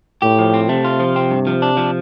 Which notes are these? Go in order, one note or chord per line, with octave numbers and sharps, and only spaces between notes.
A2 G4
F3
C4
C3 A3
F4
F3
C4
G2
F3
D4
F3